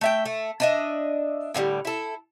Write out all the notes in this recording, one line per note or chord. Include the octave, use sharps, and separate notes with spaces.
A3 E5 G5
A3
D4 D#5 E5
A2 D3 D#3 G3
E4 A4